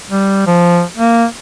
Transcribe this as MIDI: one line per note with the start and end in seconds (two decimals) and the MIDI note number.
0.10 0.44 55
0.47 0.82 53
0.97 1.25 58